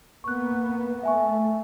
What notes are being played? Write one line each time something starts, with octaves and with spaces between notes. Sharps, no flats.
A#3 B3 C#6 F#6
A3 E5 G#5 C#6